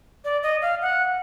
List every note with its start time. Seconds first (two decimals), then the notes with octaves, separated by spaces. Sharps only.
0.24 D5
0.43 D#5
0.62 F5
0.82 F#5